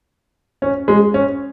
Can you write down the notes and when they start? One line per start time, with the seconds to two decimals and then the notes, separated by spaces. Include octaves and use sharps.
0.62 C#4
0.88 G#3
1.14 C#4